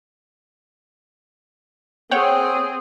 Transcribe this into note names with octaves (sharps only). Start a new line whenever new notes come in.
C4 G#4 C#5 F#5 G5